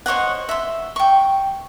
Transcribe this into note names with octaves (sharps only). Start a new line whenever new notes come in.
C5 C#5 D#5 F#5
E5 C6
G5 C#6